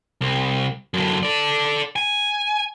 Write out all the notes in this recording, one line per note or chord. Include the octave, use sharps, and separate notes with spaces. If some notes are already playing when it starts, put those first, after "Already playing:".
C2
F#2 D3
A4 D5
G#5